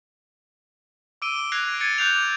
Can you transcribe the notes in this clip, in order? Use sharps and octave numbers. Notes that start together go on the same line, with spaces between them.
D6 E6 D7 D#7 G7
D7
F#6 G#6 A#6 C7 D7 F7
G#6 A6 C#7 D#7
D6 F#6 G6 C7 F7